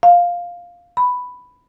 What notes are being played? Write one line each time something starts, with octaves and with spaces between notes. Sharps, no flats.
F5
B5